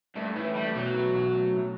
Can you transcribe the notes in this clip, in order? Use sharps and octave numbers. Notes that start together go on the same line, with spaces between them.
G2 A3
A2 E3
G3 A3
B1 F#3
E3
B1
A3
A2